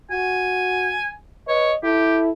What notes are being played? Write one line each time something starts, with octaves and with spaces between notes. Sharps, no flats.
F#4 G#5
B4 C#5 D#5
E4 G4 A4